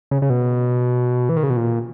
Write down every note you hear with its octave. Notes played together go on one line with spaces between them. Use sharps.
C#3
C#3
B2
E3
D#3
C#3
B2
A#2